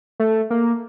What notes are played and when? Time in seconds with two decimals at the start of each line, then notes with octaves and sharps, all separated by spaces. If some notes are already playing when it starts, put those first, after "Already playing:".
0.20 A3
0.50 A#3